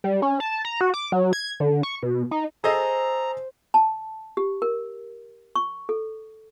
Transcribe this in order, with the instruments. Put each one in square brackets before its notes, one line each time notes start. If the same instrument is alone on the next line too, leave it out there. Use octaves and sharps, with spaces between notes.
[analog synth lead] G3
C#4
A5
A#5
F#4
D6
F#3
G#6
D3
C#6
B2
D#4
[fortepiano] G#4 A4 D#5 [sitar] C5 [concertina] A#5
[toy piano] A5
G4
A#4
C#6
A4